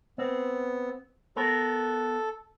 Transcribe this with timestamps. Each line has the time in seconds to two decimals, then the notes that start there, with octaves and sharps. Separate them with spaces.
0.18 B3 C4
1.36 B3 A4 A#4